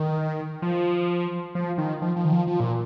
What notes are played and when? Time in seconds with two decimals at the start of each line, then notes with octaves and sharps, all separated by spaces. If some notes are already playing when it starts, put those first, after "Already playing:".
Already playing: D#3
0.62 F3
1.55 F3
1.78 D#3
2.02 F3
2.16 F3
2.25 D#3
2.33 F3
2.47 F3
2.60 A#2